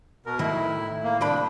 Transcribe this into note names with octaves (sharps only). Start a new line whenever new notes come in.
B2 A#4
A2 D#3 E4
A#3
C2 D4 G4 B5